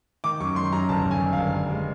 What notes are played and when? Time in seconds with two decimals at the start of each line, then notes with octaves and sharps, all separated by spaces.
0.24 D#3 D6
0.40 F#2 C#6
0.56 D#3 C6
0.73 F#2 A#5
0.89 G1 A5
1.05 G1
1.11 G#5
1.22 D#3
1.32 F5
1.38 G1
1.54 G2
1.71 G#3